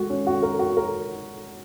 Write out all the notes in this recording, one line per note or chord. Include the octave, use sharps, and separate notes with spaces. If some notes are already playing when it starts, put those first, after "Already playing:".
Already playing: G#3 F#4
C#4
F#4
A#4
F#4
A#4